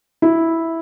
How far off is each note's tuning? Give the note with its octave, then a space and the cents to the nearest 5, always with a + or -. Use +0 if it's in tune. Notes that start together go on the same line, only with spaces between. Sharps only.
E4 -5